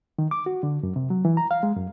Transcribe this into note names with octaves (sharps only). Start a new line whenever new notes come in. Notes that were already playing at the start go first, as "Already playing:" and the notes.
D#3
D6
F#4
D3
F#2
C3
F#3
E3
A#5
F5
G#3
F#2